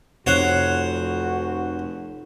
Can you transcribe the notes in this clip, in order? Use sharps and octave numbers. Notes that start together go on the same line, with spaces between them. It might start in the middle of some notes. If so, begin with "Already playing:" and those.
F1 F2 C3 F#4 C5 C#5 F#5